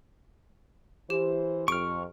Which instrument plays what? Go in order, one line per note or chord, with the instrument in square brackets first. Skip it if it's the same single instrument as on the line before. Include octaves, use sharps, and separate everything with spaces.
[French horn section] E3 C5 [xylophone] G4
[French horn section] F2 [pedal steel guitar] C#6 F6 [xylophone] D7